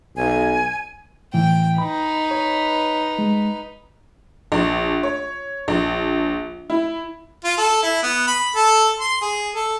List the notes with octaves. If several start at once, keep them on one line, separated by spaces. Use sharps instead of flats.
B1 G#5
A2 E3 G5
D#4 B4 B5
C#5
G#3
A#1
C#5
A#1
E4
F4
A4
E4
B3
B5
A4
C6
G#4
A4